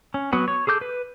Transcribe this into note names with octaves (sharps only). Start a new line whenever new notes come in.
C#4
F#3 B3 F#4
C#5
G#4 A4 D6 G6
B4